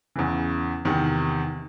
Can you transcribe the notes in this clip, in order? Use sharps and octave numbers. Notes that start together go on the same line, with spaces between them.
E2 C#3 E3
E2 C3 D#3